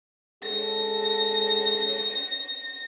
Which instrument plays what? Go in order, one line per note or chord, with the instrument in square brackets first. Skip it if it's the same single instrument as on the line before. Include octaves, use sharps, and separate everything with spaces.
[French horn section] G#3 G#4 A4 [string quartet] A#6